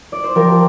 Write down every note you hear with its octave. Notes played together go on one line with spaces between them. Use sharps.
D5
C5
F3 G4 A#4